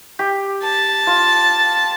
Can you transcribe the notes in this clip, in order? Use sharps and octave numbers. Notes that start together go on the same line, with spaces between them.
G4
A5
F4